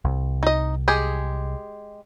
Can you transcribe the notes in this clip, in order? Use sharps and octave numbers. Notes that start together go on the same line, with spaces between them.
C2
D#4 D#5
G#3 G4 G#4